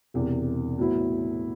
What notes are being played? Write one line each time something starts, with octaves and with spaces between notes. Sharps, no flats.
E1 E2 C3
A2 F#3 B3 E4